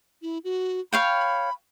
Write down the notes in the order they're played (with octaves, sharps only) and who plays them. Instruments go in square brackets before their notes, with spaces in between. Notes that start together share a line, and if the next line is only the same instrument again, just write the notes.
[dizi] E4
F#4
[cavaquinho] C#5 F5 G5 [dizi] B5